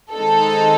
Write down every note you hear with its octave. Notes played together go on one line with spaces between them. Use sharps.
D#3 G#3 C4 D#4 A4